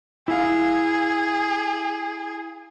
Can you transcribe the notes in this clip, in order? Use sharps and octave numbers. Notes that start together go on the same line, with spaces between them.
E4 G#4 F5